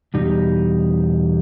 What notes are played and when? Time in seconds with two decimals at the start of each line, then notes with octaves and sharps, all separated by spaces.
0.14 E2 B2 G3 D#4 G4